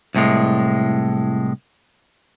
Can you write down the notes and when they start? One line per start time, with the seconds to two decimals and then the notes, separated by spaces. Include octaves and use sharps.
0.15 C2 A2 G#3